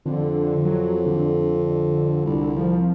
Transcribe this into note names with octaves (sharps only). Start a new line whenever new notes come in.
F2 D3
F#3
D3
C2
F3